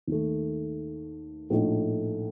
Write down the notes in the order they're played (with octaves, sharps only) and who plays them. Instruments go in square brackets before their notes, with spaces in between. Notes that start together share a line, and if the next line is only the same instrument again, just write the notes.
[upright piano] D#2 D#3 A3
A#1 A2 A3 D#4